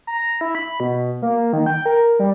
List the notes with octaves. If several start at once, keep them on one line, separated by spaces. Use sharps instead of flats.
A#5
E4
B5
B2
A#3
D#3
G5
A#4
G3